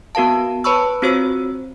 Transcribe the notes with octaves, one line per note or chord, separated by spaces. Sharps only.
B3 F#4 A#4 F5 A5
B4 C#5 A5 B5 C#6 E6
C4 F4 F#4 C5 C#5 E6